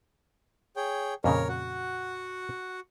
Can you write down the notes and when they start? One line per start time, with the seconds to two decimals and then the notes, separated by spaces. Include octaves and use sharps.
0.76 G#4 C#5 G5
1.24 F2 A#2 C#3 A#4 C#5
1.48 F#4 F#5